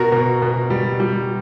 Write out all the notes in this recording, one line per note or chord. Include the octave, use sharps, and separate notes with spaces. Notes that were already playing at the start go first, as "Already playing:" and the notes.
Already playing: B2 F#4 A#4
B2
B2
G3
G3